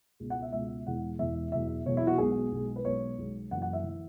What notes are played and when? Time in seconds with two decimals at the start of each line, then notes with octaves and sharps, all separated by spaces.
0.20 C#2 B2 G#3
0.30 F#5
0.42 E5
0.53 C#2 B2 G#3 E5
0.87 E1 E2 E3 G#3 F#5
1.19 E1 E2 E3 G#3 E5
1.52 E1 E2 B2 F#3 E5
1.86 E1 E2 B2 F#3 C#5
1.97 E4
2.07 F#4
2.18 B1 B2 G#3 G#4
2.52 B1 B2 G#3
2.76 B4
2.85 B1 B2 G#3 C#5
3.18 B1 B2 G#3
3.51 F#1 F#2 E3 F#5
3.62 F#5
3.73 E5
3.84 E3